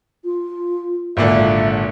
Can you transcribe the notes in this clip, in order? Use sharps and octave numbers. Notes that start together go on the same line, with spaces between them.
F4
G#1 A#2 D3 E5